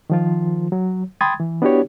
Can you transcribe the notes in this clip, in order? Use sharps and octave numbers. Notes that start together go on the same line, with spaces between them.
D#3 F3 F4
F#3
G5 B5 C6 D#6 G#6 A6
E3
B3 D4 E4 F#4 G4 C#5